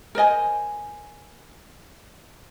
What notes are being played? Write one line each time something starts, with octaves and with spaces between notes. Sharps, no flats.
A#4 C5 D#5 G#5